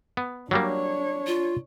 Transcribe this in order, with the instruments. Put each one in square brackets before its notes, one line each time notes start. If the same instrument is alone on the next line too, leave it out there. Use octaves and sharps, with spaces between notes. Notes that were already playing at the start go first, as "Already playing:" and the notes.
[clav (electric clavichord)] B3
[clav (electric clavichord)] F#3 G3 A#3 [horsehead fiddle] D4 C#5
[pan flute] F4